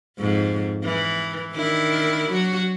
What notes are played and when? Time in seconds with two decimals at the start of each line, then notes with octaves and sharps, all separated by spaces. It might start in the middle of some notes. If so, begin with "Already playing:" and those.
0.18 F2 G#2
0.84 E3
1.54 D#3 D4 E4
2.31 F#3 F#4